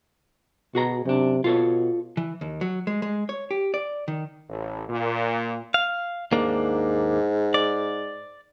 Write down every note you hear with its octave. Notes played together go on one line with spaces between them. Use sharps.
B2 F#4 G#4 A#5
F#2 C3 D4
B2 F4 A4 C#5
E3
D#2
F#3
G#3
G#3
C#5
G4
D5
D#3
A1
A#2
F5
D#2 G#2 A#3 D4
D5